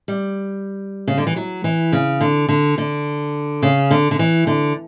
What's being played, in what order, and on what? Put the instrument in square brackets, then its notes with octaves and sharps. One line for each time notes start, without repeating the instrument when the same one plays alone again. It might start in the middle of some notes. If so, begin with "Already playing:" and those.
[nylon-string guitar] G3
C#3
D3
E3
F#3
E3
C#3
D3
D3
D3
C#3
D3
D3
E3
D3